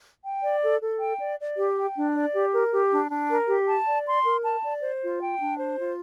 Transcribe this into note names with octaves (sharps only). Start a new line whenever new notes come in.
G5
D5
A4
A4
G5
D5
D5
G4
G5
D4
D5
G4
A#4
G4
D4
D4
A#4
G4
A5
D5
C6
A#4
A5
D5
C5
F4
G5
D4
C5
F4